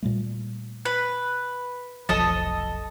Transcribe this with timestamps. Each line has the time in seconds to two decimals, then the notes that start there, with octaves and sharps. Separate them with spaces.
0.02 A#2 G3 A3
0.85 B4
2.09 F1 B1 F3 A4 D#5 A5